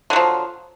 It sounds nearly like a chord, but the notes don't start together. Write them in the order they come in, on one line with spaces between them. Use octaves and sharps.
D3 F#3 F3